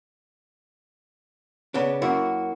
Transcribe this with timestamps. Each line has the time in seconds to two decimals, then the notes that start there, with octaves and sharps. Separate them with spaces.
1.74 C#3 B3 D4
2.02 F#2 A#3 E4 F#4